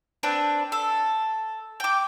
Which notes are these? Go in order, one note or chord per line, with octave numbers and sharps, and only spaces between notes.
C4 D4 B4
A4
G5 D6